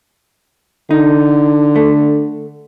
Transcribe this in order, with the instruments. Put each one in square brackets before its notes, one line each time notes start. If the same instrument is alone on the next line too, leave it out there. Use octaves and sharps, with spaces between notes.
[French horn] D3 [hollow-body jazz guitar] D#4
[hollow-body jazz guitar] A3